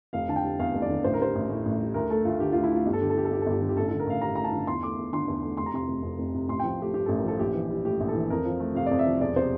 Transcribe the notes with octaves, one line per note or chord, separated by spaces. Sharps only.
F1 F5
D3 A5
G5
G3
E2 F5
F1
D5
D3
A1 C5
A#4
G3 C5
A1
A2
A1
G3
D2 A#4
A3 A4
D2 F4
D3 G4
D2 F4
E4
A3 F4
G1 G4
A4
D3 G4
A4
G3 G4
A4
G2 G4
A4
G1 G4
D3
G4
A1 A4
D3 A4
A#4
A1 F5
G2 A#5
A1 A#5
A5
D3
E2 C6
A3 D6
E2
D3 C6
E2
A3
F1 C6
A#5
C3 C6
F1
F2
F1
C3
A1 C6
F3 G5
A3 G4
G2 G4
A1 A4
A#4
F3 A4
A#1 G4
E3
G3
A2 G4
A#1
A4
E3
F2 A#4
F3
A3
C3 F5
F2 D5
E5
F3
E1 D5
C3 C5